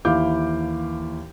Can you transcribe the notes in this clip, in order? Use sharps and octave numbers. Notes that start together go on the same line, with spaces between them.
D#2 E3 E4 F5 D6 G6